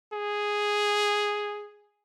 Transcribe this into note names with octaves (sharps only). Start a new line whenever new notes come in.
G#4